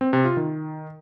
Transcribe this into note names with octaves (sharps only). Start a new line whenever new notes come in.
C4
C3
F4
D#3